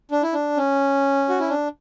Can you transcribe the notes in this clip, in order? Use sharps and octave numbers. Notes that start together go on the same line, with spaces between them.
D4
E4
D4
C#4
F#4
E4
D4